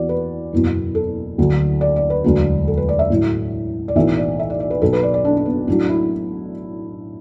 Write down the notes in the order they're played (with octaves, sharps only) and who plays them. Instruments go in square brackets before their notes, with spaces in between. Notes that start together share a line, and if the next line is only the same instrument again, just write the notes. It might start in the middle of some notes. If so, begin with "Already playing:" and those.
Already playing: [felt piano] E2 E3 F#4 D5
B4
F#1 E2 B2 F#3
A4
D2 D3 F#3
D5
D5
B4
E1 D2 D3 F#3
A4
B4
D5
E5
A1 A2 F#3
D5
B1 A2 E3 E5
D5
E5
D5
D5
B4
B1 B2 F#3 A4
B4
D5
D5
D4
D4
B3
A1 A2 F#3 D4
E4